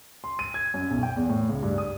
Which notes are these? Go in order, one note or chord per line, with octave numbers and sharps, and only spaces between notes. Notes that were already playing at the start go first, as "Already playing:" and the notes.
C6
D#7
G#6
F#2
B1
G5
E2
A2
C#2
G2
D#6